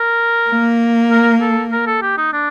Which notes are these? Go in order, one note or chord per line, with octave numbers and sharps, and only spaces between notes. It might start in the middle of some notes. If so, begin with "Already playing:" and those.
Already playing: A#4
A#3
A#4
A4
A#4
A4
G4
D#4
D4